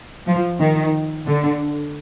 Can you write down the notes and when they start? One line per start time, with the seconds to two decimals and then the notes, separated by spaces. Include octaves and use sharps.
0.27 F3
0.60 D#3
1.27 D3